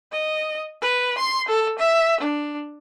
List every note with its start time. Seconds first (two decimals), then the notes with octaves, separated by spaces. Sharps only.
0.12 D#5
0.82 B4
1.18 C6
1.48 A4
1.79 E5
2.20 D4